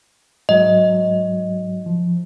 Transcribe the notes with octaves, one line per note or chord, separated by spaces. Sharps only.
G#2 F#3 D#5
F3